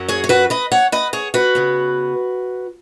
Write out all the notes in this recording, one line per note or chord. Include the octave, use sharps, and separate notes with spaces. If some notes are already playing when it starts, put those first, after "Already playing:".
Already playing: F#2 F#3 C#4
G#4 C#5
C#5
F#4 B4
B4 D#5
C#5 F#5
B4 D#5
G#4 C#5
F#4 B4
C#3 B3